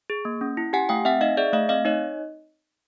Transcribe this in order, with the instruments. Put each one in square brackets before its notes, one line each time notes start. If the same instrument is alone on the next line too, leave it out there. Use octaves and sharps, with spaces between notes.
[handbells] G#4
A#3
C#4
E4
G4 F#5 G#5
A3 F5 G5
C4 E5 F#5
D#4 D#5 F5
G#4 D5 E5
A3 D#5 F5
C4 D#5 F5
D#4 C#5 D#5